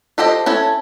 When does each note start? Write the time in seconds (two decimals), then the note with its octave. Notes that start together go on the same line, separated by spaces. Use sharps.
0.18 F4 G4 A4 C5 D#5
0.46 C#4 E4 A4 C#5